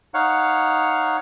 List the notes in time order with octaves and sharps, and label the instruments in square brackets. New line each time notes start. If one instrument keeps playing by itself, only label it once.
[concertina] D#4 C#5 F5 F#5